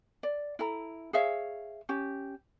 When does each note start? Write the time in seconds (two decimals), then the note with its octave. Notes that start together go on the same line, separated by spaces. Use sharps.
0.23 D5
0.59 E4 A4 A#5
1.13 G#4 C#5 E5 F5
1.89 C#4 G4